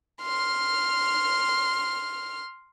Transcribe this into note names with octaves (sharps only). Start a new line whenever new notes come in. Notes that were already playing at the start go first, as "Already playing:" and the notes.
C6 F6